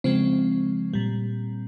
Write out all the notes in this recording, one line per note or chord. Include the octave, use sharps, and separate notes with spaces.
C#3 F3 G#3 C4
A#2 G3